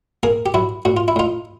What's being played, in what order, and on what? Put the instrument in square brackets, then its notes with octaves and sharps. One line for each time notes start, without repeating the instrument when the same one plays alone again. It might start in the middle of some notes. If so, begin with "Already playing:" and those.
[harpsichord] A#3 G#4 A#4
G4
F#3 E4 F#4
A2 F#4
F4
E4
A2 D#4 F4